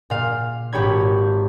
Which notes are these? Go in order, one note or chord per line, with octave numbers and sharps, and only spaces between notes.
A#2 F5
G#1 G4 C#5 B5 G#6